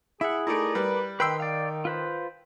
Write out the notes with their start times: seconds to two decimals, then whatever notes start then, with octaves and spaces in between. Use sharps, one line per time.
0.21 E4 G#4 E5 F#5
0.47 A3 D#4 E4 A#4 D5
0.75 G3 B4
1.20 D#3 B4 G5 C6 E6
1.40 D5 F5
1.85 F4 B4 C5